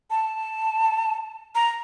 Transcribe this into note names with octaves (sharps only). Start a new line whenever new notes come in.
A5
A#5